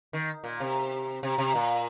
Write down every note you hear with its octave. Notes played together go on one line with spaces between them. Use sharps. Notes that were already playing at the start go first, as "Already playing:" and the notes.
D#3
A#2
C3
C3
C3
A#2